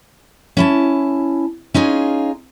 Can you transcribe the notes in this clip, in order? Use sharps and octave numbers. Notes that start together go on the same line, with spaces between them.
C#4 E4 A5
C#4 D#4 F4 G#4